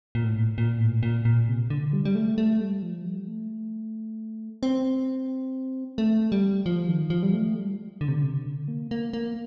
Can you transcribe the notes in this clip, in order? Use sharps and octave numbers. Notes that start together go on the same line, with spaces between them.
A#2
A2
A#2
A2
A#2
A#2
C3
D3
G3
G3
A3
A3
G3
F3
G3
A3
C4
A3
G3
F3
D#3
F3
G3
A3
G3
D3
C3
D3
C3
D3
A#3
A#3
A#3